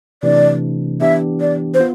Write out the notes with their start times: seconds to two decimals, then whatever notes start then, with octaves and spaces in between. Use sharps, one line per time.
0.23 C3 E3 A3 D4 D5
1.01 E3 B3 D4 G4 E5
1.41 D5
1.74 C5
1.80 B3 F4